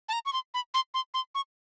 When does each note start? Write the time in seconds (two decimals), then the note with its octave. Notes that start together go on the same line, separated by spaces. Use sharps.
0.09 A5
0.13 A#5
0.26 C#6
0.33 C6
0.54 B5
0.74 C6
0.94 C6
1.14 C6
1.35 C#6